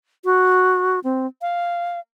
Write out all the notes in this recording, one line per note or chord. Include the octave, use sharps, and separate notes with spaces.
F#4
C4
F5